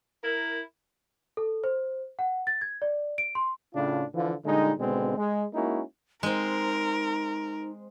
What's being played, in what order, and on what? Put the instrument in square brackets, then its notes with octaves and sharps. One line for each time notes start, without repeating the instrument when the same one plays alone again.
[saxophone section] E4 A#4
[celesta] A4
C5
F#5
A6
G#6
D5
D7
C6
[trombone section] A2 C#3 D4 F4
D3 E3 F3 F4
A#2 D3 G3 G#3 D#4
G#1 B2 D3 G#3 B3 C4
G#3
G#3 A#3 C#4 D#4 E4 F#4
[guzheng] G#3 C4 [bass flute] D#4 [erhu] A#4